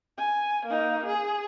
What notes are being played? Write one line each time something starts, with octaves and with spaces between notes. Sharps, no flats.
G#5
A#3 D#4
G#4